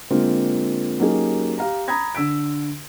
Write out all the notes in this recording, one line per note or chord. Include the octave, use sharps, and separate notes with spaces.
D3 G#3 A#3 C4 F4
F#3 A#3 C#4 D#4 G4 G#4
G4 F5 A#5
A#5 B5 D#6 G#6 A#6
D3 E6 B6 D7